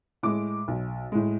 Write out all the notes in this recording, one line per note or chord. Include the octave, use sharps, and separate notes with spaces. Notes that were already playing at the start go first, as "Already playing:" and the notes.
A2 G#3 D6
B1
A2 G#3